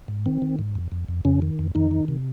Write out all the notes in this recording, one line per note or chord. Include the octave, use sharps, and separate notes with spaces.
G#2
D#3 C4
D#3
G#2
F2
F2
F2
F2 C#3 C#4
D#3
F2
F2 D#3 D#4
D#3
C3